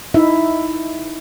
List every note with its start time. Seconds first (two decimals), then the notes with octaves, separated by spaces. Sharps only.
0.14 D#4 E4 E5